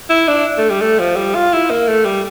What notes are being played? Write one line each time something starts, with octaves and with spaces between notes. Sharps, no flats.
E4
D4
A3
G3
A3
F3
G3
F4
E4
A#3
A3
G3